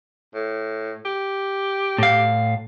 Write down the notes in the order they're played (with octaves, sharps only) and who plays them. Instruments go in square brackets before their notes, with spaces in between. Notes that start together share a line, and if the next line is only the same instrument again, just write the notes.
[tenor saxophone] A2
G4
[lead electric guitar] A2 F5